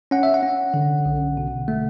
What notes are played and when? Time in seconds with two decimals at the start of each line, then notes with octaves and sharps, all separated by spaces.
0.11 C#4 F#5
0.23 E5
0.34 F#5
0.43 C#4
0.74 D3
1.05 B1
1.37 B2
1.68 A3